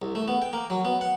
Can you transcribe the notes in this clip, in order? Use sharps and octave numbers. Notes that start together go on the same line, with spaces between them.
C2
A3
B3
G5
A#3
F#3
B3
F#5